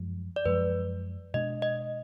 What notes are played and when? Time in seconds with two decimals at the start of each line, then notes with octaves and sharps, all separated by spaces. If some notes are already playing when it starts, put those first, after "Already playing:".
Already playing: F#2 F3 G#3
0.36 D5
0.45 F#2 F3 G#3 B4
1.34 B2 G#3 D4 D#5
1.62 D#5